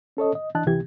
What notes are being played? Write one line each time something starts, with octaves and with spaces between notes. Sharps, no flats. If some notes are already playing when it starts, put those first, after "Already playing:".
C#4 A4 C#5 D#5
D#5
E3 D4 D#5 A5 F#6
C#2 C3 E3 G4 G#6